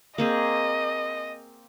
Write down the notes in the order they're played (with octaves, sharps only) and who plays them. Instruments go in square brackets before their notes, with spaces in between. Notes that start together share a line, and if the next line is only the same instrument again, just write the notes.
[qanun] A#3 C4 G#4 [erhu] D#5